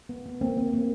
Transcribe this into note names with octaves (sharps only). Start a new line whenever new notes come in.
B3
B3
A#3 C4
A#3 C4
A#3